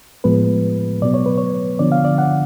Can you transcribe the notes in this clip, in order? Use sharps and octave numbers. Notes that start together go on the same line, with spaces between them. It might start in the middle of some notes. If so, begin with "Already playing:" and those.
A2 F3 G#3 B3 B4
B2 F#3 B3 D5
C#5
B4
C#5
D3 F3 B3 D4 D5
F5
D5
F#5